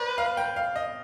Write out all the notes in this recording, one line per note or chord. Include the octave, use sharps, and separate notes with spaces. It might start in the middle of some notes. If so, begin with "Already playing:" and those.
Already playing: B4 C5 D5
F5
G5
F5
D#5